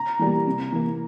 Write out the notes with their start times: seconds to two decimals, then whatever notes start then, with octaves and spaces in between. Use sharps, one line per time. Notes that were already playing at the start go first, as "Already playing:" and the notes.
Already playing: A#5
0.19 E3 G3 A#3
0.47 C3
0.72 E3 A#3